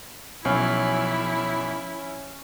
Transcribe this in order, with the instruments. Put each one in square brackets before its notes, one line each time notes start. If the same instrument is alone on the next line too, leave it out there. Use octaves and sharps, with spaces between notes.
[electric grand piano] B1 [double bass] F3 [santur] C#4 [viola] E4